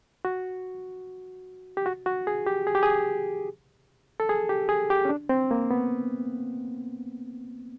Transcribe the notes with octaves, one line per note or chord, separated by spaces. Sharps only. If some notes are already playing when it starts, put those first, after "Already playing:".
F#4
G4
F#4
F#4
G#4
G4
G#4
G4
G#4
A4
G#4
G4
G#4
G4
C#4
D4
C4
A#3
B3